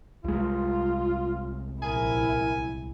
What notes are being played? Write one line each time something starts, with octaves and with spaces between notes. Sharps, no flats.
C2 G#3 F4
A#1 E4 A#4 G#5